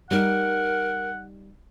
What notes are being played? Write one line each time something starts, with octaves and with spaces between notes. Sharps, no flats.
G3 D#4 A#4 F#5